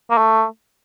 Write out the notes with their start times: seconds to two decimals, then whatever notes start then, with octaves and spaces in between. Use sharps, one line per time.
0.11 A#3
0.18 A3